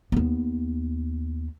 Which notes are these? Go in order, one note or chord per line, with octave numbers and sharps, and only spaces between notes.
D#2 B3